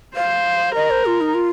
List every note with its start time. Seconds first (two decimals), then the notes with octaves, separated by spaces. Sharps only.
0.16 C5 F5
0.75 A#4 D#5
0.90 C5
1.06 F4
1.21 D#4
1.34 F4